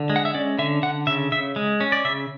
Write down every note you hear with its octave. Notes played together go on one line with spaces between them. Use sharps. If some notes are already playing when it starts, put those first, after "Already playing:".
Already playing: D3
G#3
F#5
E5
C#4 D5
D3 E5
D3 F#5
C#3 E5
C#3 E5
G#3
C#4
D5
C#3 E5